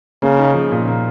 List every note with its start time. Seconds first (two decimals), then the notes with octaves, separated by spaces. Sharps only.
0.22 C#3 A#3
0.39 D#4
0.54 F3
0.71 A#2
0.88 A#3